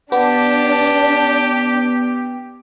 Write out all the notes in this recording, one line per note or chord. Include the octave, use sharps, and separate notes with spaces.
B3 D4 G4